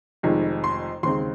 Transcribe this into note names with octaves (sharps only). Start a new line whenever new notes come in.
F1 F2 D#3 G#3 D#4
C6
D#2 C#3 G#3 C4 D#4 C6